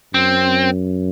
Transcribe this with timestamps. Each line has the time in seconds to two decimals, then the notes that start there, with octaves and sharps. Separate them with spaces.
0.14 F#2 C4